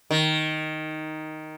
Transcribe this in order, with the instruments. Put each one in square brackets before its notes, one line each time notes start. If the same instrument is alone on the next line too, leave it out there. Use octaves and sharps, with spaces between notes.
[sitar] D#3